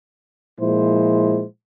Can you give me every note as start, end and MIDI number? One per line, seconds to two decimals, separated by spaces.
0.60 1.43 46
0.60 1.43 53
0.60 1.43 56
0.60 1.43 64
0.60 1.43 72